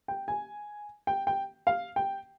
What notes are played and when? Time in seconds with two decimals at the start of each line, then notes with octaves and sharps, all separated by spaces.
0.08 G5
0.28 G#5
1.07 G5
1.27 G5
1.67 F5
1.96 G5